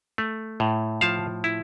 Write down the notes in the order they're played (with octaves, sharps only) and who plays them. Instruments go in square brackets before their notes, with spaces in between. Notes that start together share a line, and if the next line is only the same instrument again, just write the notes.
[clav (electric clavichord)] A3
A2
F3 F5 A5
E4